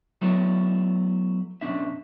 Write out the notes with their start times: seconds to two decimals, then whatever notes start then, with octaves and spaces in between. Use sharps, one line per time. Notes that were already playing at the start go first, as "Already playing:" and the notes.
0.21 F#3 A3 B3 E4 A4 C#5
1.61 B1 F#2 D3 C#4 D4 E5